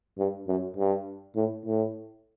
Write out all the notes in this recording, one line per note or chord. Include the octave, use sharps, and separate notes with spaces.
G2
F#2
G2
A2
A2